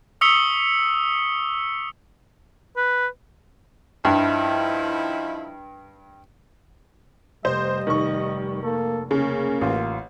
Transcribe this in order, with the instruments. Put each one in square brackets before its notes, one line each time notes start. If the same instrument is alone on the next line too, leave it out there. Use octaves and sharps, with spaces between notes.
[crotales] C#6 D#6 E6 B6 C#7 G7
[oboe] B4
[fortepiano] G2 [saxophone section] F3 D#4 E4
[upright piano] F1 [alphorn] G3 [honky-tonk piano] C5 [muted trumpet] D#5
[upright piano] F1 C#6 [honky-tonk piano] D#3
[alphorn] A#3 [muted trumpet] A4
[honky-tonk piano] C#3 [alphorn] A#3 [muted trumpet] C#4
[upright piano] A1 [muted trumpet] F4